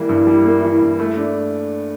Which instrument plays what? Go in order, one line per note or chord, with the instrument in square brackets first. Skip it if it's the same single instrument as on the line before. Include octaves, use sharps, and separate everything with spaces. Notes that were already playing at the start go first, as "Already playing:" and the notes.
Already playing: [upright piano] E3 G3 A#3 [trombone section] E4
[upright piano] G2
G3
A#3
[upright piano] E3 [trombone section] E4
[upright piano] G2
A3
D4